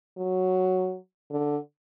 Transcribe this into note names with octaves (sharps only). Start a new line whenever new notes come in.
F#3
D3